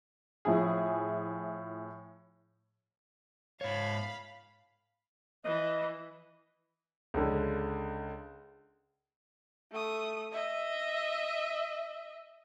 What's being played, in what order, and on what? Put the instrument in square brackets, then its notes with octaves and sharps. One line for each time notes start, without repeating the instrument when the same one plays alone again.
[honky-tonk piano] A2 F3 E4 G#4
[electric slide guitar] G#2 C#5 [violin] F5 B5
[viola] E3 [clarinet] D#5
[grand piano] C#2 D3
[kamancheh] A3 D#6
D#5 E5